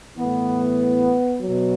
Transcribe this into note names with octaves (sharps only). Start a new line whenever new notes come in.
A2 E3 B3
B2 F#3